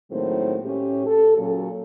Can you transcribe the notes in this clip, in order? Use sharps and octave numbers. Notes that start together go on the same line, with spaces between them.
A2 D#3 F#3 G#3 A#3 C4
A2 C#4 G4
A4
A#2 C#3 F#3